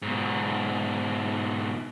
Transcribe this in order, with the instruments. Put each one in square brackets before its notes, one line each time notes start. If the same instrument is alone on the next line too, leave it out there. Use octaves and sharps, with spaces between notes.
[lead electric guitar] G#2 B2